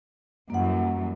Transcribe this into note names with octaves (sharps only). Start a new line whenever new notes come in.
F#2 E3 G3 A#3 F#5